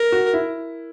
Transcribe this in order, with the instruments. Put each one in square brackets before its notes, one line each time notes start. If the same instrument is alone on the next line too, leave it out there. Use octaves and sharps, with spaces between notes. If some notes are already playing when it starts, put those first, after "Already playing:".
Already playing: [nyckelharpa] A#4
[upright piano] F#4
E4